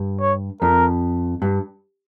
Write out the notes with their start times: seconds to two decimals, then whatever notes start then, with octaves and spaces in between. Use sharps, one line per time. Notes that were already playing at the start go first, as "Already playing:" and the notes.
Already playing: G2
0.21 C#5
0.62 F2 A#4
1.42 G2